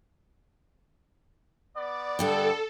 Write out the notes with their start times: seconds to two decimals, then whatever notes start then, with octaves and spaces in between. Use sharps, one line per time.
1.76 B3 D5
2.19 G2 D3 A4 G5